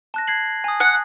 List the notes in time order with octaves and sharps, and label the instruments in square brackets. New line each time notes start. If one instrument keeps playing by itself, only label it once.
[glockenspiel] A5 F#6 A#6
G#6 C7 F#7
G#5 D#6
[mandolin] F#5